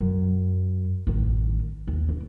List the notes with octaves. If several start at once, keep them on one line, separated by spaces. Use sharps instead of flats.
F#2
A1 D#3
D#2
D4